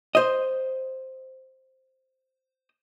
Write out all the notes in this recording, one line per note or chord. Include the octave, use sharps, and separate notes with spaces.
C5 D#5